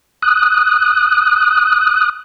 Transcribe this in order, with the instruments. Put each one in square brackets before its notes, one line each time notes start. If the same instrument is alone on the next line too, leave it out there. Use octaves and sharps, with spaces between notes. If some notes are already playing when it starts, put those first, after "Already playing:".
[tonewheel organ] D#6 F#6